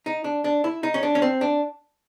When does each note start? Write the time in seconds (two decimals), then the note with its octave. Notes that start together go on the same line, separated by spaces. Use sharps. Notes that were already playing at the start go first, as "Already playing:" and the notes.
0.06 D#4
0.24 D4
0.44 D4
0.64 E4
0.83 D#4
0.94 C#4
1.03 D4
1.15 C#4
1.22 C4
1.41 D4